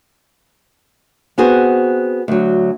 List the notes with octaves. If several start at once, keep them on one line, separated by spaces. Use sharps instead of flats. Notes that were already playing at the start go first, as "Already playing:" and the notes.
B3 C4 F#4 G#4 C5
D2 F#3